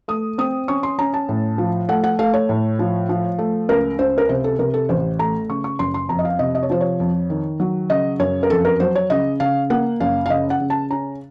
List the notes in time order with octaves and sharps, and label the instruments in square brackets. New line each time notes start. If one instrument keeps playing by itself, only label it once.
[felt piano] A3 D#6
C4 D#6
C#4 C#6
C6
C#4 A#5
A5
A2
F3
A3 F#5
F#5
A3 F5
C#5
A2
F3
F3
A3
C#2 A#4
C#2 C5
A#4
C3 C5
A4
C3 A#4
A4
A1 C5
A3 A#5
C#3 C#6
C#6
F#1 C6
C6
F2 A#5
D#5
F5
C3 D#5
D#5
C#5
F3 C5
C#5
F2
D#3
F#3
C#3 D#5
F#2 C#5
A#4
F2 A4
A#4
F#3 C5
C#5
C#3 D#5
C#3 F5
A#3 F#5
F#1 F5
F5
C#3 D#5
F#5
C#3
A5
C#4 A#5